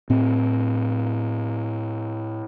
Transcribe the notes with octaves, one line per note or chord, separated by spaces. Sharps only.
A2 C4